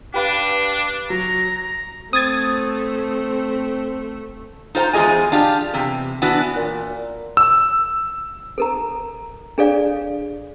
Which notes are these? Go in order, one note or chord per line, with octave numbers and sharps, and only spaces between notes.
D4 G4 B4 F5
F#3 A#5
A3 C4 D#6 G#6 A6
D#4 F4 C5 G5 A#5
E2 G#3 F4 G#4 D#5 G#5
D4 F4 G4
E2 C3
E3 B3 D4 F#4
A#2
E6
A4 A#4 A#5
D4 G#4 A4 C#5 D5 F5